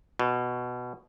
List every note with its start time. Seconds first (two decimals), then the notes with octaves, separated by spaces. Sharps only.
0.19 B2